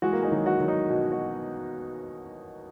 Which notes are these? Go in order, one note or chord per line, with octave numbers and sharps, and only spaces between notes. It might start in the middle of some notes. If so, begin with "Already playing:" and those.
E3 G#3 F#4
A#3
G#3 D#4
D#3 F#3
F#4
D#3 F#3
D#4
B2
F#4